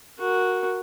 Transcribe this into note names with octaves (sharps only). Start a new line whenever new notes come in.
F#4 A#4